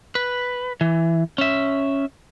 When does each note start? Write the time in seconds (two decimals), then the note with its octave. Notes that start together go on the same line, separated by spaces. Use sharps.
0.15 B4
0.81 E3
1.38 C#4 E5